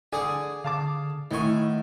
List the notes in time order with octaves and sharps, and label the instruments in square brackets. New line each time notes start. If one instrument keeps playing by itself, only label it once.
[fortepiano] D3 G#5 [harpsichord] G#4 D5
[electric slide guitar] D3 [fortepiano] F5 A5 D6
[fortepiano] A2 E4 C#6 [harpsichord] D#3 G#5 [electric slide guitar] A3 F#5